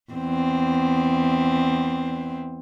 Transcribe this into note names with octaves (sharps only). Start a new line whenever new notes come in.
E2 C4